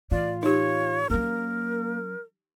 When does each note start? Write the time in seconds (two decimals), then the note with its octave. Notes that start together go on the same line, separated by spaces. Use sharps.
0.11 A2 E3 F4 D5
0.43 D#4 G4 C#5
1.10 F#3 A#3 C#4 A#4